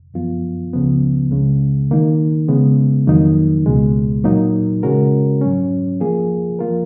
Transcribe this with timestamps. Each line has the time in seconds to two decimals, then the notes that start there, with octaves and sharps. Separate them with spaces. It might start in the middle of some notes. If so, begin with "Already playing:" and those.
0.14 F#2 F3 B3 F4
0.73 C#2 C#3 F3 B3
1.31 C#2 C#3 G#3
1.91 D#3 A#3 D#4
2.48 C#3 G#3 B3
3.07 F2 D#3 F#3 A#3 D#4
3.66 C#2 B2 G#3
4.24 A#2 F#3 A#3 D#4
4.83 C#3 G#3 C#4 F#4 A#4
5.41 G#2 F#3 C#4
6.00 F3 A#3 F4 G#4
6.59 F3 A#3 F4 A#4